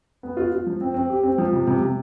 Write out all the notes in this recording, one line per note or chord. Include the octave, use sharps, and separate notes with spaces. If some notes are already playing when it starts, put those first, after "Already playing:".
B3
F4
F4
F3
C4
C4
G4
C4
F3
C3
C3
C3